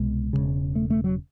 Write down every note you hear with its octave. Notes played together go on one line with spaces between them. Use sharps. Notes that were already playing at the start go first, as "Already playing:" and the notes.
Already playing: C2 B2 G#3
E1 D#2 C#3
A3
A3
F#3